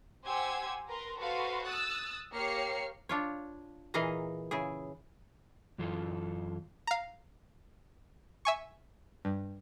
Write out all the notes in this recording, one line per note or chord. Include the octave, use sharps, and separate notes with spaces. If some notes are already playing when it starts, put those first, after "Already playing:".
G4 C5 F#5 G#5 E6 G#6
A#4 B4 A#5 C6
F#4 A4 B4 C5 F5
D#6 E6 F#6 A6
A#3 G4 C#5 F6 C7 C#7
D4 F4 C#5
A#2 E3 G#4 D#5 F5 A#5
C#3 E4 G#4
F#2 E3 F4 A4
F5 A#5
E5 G#5 C#6
G2